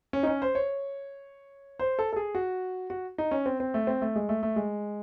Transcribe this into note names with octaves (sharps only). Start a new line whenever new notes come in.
C#4
D#4
C#4
C5
C#5
C5
A4
A4
G#4
F#4
F#4
D#4
C#4
C4
C4
A3
C4
A3
G#3
A3
A3
G#3